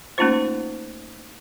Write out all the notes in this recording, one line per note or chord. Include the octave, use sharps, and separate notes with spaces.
A3 A#3 C#4 D#4 F4 C5